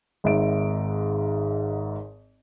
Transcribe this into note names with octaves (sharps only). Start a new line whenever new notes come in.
G#1 G#2 E5 D7